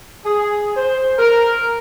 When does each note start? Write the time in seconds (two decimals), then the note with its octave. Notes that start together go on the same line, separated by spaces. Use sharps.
0.25 G#4
0.76 C5
1.18 A#4